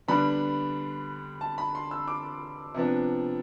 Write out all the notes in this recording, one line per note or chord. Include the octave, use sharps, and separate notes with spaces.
D3 G3 B3 D4 B5
A5
B5
C6
E6
D6
C3 F3 B3 D4